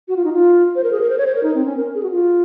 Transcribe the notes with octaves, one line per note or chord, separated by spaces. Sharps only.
F#4
F4
D#4
F4
C5
A#4
G#4
A#4
C5
C#5
C5
A#4
D#4
C4
C#4
A#4
G#4
F#4
F4